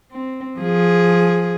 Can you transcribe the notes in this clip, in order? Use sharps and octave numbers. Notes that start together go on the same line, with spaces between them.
C4
F3 G#4